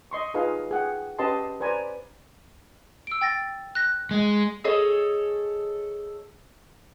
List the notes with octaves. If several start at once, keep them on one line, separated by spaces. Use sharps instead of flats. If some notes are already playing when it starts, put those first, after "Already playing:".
D#5 C6 C#6
D#4 F4 G#4 B4 D#5 F5
G#4 F#5 G5
C#4 G4 B4 D#5 A5 C6
B4 C5 D5 G#5 A#5 B5
E6 D7
G5 A6 A#6
F#6 A#6
G#3
G#4 A4 C#5 D#5